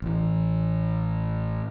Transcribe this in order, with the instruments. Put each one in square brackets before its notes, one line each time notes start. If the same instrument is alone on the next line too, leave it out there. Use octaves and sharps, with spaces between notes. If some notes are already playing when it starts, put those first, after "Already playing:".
[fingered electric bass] A1 E3